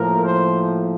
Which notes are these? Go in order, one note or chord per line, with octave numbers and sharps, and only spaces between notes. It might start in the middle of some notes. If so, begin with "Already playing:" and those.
Already playing: A2 F3 A#3 A#4
C5